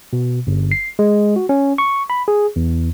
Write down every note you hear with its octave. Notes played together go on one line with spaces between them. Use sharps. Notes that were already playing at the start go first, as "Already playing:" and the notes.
B2
G1
C7
G#3
F#4
C#4
C#6
B5
G#4
E2